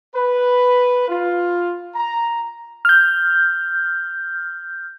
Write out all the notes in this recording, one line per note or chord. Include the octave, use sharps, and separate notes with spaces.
B4
F4
A#5
F6 G6